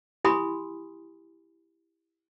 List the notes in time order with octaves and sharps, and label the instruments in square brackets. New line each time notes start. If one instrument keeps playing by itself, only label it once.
[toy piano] E4 G4 G#5 B5 C6 D#6